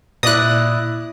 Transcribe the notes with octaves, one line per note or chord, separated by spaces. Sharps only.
A#2 E4 D5 D#6 F#6 A#6